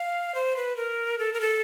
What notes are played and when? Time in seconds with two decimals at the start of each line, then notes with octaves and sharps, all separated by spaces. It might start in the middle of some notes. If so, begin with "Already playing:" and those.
Already playing: F5
0.35 C5
0.56 B4
0.76 A#4
1.18 A4
1.33 A#4
1.41 A4